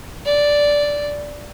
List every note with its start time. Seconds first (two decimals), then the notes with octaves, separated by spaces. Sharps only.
0.26 D5